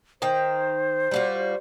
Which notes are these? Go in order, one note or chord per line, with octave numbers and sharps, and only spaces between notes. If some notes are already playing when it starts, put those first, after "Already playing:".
D#3 C5 G5
G3 F4 F#4